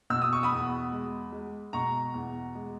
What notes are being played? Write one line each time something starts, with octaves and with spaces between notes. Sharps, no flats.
B2 E6
D#6
C#6
B5 D#6
E2
G#3
G#3
B2 A#5 C#6
E2
G#3